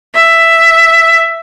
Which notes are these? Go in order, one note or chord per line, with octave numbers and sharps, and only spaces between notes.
E5